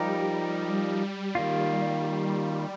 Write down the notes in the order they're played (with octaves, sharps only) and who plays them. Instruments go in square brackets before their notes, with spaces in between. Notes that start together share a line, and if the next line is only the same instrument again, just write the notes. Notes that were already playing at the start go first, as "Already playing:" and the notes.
Already playing: [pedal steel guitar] F3 D#4 G4 A#4 [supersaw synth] G3
[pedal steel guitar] D#3 A#3 F4